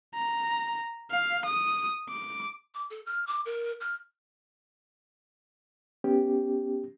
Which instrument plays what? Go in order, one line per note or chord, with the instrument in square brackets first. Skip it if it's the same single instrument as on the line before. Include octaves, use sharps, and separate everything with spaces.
[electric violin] A#5
F5
D#6
D6
[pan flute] D6
A4
F6
D6
A#4
F6
[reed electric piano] B3 C#4 G4